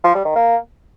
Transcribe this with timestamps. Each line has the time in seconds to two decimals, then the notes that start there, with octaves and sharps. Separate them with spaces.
0.04 F3
0.15 G3
0.25 D#3
0.36 A#3